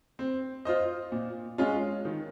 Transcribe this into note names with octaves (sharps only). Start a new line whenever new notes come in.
C4
F4 C5 D#5
A#2
G#3 C#4 F4
D#3